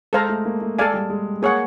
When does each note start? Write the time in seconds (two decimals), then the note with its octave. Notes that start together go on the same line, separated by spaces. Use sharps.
0.13 G#3 A4 C5 F5 A#5
0.29 A3
0.45 A#3
0.61 A3
0.78 G#3 A4 D5 F5 G#5
0.94 G3
1.10 G#3
1.42 A#3 G#4 C#5 F#5